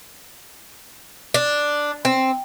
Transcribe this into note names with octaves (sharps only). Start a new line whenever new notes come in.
D4
C4